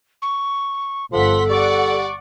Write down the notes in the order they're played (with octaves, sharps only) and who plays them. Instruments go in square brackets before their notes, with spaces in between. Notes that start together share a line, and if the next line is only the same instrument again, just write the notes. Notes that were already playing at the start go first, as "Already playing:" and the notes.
[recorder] C#6
[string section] G1 F#5 B6 [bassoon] F3 [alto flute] A4 [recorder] C6
[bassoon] G3 [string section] D5 F#5 [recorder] C#6